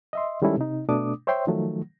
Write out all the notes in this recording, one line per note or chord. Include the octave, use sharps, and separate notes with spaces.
D#5 E5 C6
D#3 G3 G#3 C#4 E4 A4
C3 D#4
B2 A3 D4 D6 D#6
C5 C#5 E5 G5 C6
D#3 F3 F#3 A3